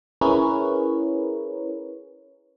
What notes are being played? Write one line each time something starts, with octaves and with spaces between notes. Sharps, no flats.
C#4 E4 G#4 A#4 B4 C#5